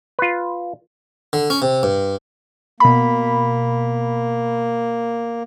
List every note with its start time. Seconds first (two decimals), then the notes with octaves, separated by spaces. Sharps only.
0.19 F4 B4
1.33 D3
1.50 C#4
1.62 C3
1.83 G2
2.80 B2 A#3 B5